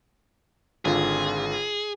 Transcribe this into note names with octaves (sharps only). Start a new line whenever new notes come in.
G#1 D3 F4 G#4